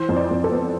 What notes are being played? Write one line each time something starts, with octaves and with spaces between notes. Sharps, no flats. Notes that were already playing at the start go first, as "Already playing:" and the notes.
Already playing: E3 C5
F2
D5
F2
A4
B3